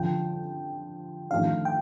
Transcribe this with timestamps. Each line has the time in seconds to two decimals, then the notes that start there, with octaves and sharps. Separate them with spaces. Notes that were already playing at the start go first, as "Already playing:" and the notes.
Already playing: F2 D3 F3 G5
1.30 F2 D#3 A3 D4 A4 F5
1.65 G5